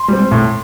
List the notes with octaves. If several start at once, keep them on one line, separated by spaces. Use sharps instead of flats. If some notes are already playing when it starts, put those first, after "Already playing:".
Already playing: C6
G3 C4
A2